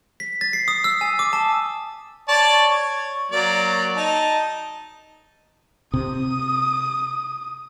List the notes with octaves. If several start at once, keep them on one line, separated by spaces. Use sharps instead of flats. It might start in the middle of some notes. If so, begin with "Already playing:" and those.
B6
A6
C7
D#6
E6
G#5
D6
A5
C#5 D5 A5
C#5
F#3 A#3 D5
D#4 A5
C3 D#6